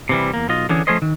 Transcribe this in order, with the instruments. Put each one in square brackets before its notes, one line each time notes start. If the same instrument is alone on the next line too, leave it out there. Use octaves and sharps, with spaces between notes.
[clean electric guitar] C3 E3 G3
E2 A#3
B1 F4 D#5
D3 E3 C#4 G#4
F3 A3 C#4 G#4 C5 D#5
D#3